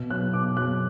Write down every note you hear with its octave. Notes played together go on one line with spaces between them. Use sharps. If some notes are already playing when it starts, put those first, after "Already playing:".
Already playing: B2
F#3 B3 F#6
B2 D6
F#3 B3 F#6